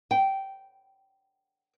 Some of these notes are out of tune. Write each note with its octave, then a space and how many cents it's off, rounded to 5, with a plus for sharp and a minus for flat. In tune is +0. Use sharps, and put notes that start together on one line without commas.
G5 -15